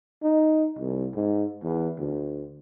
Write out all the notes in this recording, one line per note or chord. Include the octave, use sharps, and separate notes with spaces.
D#4
C2
G#2
E2
D2